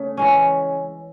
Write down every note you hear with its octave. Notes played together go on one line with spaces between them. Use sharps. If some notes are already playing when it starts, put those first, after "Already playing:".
Already playing: C#3 A3
E3 G#3 C#4